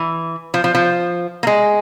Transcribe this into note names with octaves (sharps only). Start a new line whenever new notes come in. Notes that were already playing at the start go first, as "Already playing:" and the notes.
Already playing: E3
F3
F3
F3
A#3
G#3